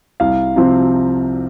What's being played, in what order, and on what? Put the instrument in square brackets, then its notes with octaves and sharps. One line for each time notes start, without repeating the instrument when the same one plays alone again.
[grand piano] C2 F5
C3 F3 C4